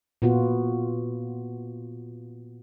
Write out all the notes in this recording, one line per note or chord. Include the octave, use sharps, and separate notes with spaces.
A#2 B3 F4 F#4